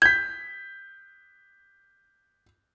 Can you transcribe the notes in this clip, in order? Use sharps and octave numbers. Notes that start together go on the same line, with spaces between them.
G6 G#6 B6